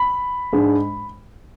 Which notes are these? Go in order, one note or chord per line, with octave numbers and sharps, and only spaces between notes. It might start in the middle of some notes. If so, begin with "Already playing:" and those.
Already playing: B5
G#2 G#3 D4